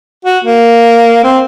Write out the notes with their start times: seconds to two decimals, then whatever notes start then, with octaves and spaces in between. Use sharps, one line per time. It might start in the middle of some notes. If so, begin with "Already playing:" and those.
0.25 F#4
0.44 A#3
1.24 C4